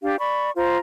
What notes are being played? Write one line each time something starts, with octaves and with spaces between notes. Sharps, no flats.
D4 G4 F5
D5 B5 C#6
F4 C5 A#5